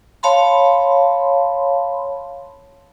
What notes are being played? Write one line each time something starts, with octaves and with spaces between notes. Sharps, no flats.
C#5 F5 A5 B5 C6